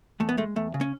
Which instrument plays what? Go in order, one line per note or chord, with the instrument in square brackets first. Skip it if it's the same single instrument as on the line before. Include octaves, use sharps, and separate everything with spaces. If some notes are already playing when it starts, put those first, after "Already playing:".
[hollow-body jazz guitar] E2 A3
B3
G#3 A3
E2 A3
C#3
C#4